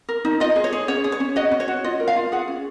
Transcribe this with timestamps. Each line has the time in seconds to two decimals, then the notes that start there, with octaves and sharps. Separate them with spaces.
0.09 A#4
0.25 D#4
0.40 F4 D#5
0.56 G#4
0.64 C#5
0.73 G#4
0.88 C#4 C#5
1.04 G#4
1.12 C#5
1.20 C#4
1.36 F#4 D#5
1.51 C#4
1.60 C#5
1.68 F#4
1.84 F4 D#5
2.00 A#4
2.08 F5
2.16 F4
2.32 G#4 F#5
2.48 C#4